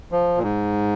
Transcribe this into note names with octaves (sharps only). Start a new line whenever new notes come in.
F3
A#2
G#2